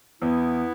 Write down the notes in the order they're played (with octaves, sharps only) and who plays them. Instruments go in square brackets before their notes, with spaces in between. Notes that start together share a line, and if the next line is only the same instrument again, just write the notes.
[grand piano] E2 [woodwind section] B3 E4